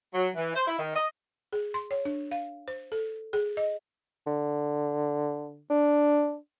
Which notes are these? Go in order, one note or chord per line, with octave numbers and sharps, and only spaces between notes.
F#3
E3
C5
E4
D#3
D#5
G#4
C6
C#5
D4
F5
C5
A4
G#4
D#5
D3
D4